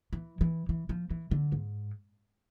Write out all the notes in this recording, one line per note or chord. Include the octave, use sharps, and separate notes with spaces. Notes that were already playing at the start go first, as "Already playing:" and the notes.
E3
E3
E3
F3
E3
D3
G#2